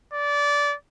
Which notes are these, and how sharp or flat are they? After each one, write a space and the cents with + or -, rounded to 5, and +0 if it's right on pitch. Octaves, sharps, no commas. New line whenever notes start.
D5 -20